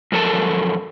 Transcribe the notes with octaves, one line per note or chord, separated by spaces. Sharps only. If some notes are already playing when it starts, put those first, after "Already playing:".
F#2 F3 A4 A#4 A5